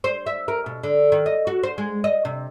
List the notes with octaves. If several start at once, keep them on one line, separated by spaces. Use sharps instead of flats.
C5
E5
A#4
B2
D3
D#3
D#5
F#4
C5
G#3
D#5
C3